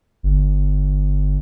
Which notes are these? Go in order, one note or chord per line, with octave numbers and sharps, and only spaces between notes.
G1